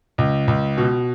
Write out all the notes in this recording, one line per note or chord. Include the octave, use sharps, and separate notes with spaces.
C#2
C#2
B2